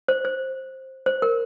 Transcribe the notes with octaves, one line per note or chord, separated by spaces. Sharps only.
C5
C5
C5
A#4